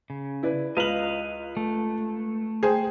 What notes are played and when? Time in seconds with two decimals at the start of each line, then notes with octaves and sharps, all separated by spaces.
0.10 C#3
0.43 E4 B4 D5
0.77 C#2 B4 D#5 F5 F#7
1.57 A3
2.63 G#4 C5 G5